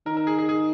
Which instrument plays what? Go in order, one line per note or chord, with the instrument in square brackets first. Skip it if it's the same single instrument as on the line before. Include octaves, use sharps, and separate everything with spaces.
[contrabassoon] D#3 [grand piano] A#4
[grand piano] A#4
G#4
G#4
G#4